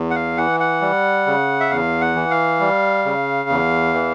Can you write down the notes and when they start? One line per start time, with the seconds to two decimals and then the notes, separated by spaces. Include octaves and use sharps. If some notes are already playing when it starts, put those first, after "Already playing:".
Already playing: E2
0.10 F#5
0.15 F5
0.37 E3 F#5
0.60 F#5
0.81 G3
1.26 C#3
1.60 E5
1.70 E2 F5
2.01 F#5
2.15 E3
2.31 F5
2.60 G3
3.05 C#3
3.50 E2
3.94 E3